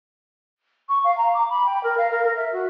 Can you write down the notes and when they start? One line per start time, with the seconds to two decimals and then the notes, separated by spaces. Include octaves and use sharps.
0.89 C#6
1.04 F5
1.18 A#5
1.34 D6
1.50 B5
1.66 G5
1.84 A#4
1.98 F5
2.11 A#4
2.24 A#4
2.37 E5
2.53 F#4